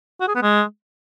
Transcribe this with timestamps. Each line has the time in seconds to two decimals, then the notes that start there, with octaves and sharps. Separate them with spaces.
0.20 F#4
0.28 G#4
0.35 B3
0.42 G#3